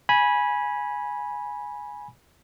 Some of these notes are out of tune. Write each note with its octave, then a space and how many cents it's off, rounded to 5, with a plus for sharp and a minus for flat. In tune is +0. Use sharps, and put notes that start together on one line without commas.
G#5 +0 B5 -20